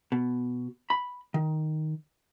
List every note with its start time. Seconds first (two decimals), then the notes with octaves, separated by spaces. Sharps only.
0.12 B2
0.90 B5
1.34 D#3